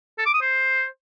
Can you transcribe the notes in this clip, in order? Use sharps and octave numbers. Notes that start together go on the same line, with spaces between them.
A4
D6
D#6
C5